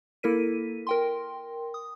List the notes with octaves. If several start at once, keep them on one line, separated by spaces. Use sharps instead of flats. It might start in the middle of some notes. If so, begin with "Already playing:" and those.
A#3 E4 A4 A#4 B6 D#7
A#4 G5 C6
D#6